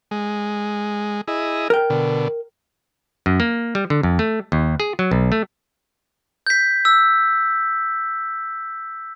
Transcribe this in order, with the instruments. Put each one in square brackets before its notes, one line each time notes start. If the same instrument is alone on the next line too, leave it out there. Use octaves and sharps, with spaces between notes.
[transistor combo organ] G#3
E4 G#4 D#5
[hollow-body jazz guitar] A#4 G5
[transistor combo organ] B2 D3
[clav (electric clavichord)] F#2
A#3
G3
D3
F2
A3
D#2
G#4
F#3
B1
A3
[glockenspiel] G6 B6
E6